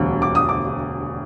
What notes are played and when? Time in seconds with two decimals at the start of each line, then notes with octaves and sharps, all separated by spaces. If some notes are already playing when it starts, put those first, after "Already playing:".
Already playing: E1 D2 G3
0.22 D6
0.35 D#6
0.49 D6